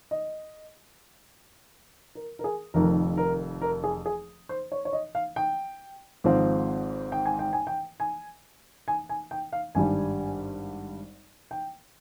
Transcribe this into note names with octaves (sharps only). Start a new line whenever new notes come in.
D#5
A#4
A#4
G#4
F1 F2 D#3 A#4
A#4
A#4
G#4
G#4
C5
C#5
C#5
D#5
F5
G5
G#1 G#2 F3 C4
G5
G#5
G5
G#5
G5
G#5
G#5
G#5
G5
F5
G#1 G2 G3 G#5
G5